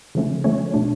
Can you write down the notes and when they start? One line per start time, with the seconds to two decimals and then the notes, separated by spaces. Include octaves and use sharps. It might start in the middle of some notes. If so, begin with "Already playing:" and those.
0.15 C#3 F3 A3 C#4
0.44 F3 A3 C#4 C#5
0.74 B2 A3 D4